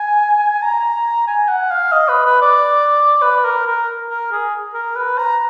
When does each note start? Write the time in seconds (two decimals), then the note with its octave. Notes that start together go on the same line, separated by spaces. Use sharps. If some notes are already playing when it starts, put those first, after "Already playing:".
Already playing: G#5
0.62 A#5
1.27 G#5
1.48 F#5
1.71 F5
1.92 D#5
2.09 B4
2.25 B4
2.41 D5
3.22 B4
3.44 A#4
3.66 A#4
4.09 A#4
4.32 G#4
4.74 A#4
4.96 B4
5.18 A#5